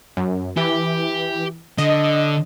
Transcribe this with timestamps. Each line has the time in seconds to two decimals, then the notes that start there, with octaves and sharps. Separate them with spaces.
0.17 F#2
0.57 E3 G4
1.78 D3 D#5